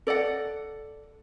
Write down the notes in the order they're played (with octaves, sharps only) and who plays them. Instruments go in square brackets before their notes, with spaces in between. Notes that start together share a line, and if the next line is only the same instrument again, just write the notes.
[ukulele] A4 D5 D#5 F#5